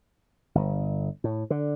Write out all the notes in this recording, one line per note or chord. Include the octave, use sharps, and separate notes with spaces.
G1
A2
D3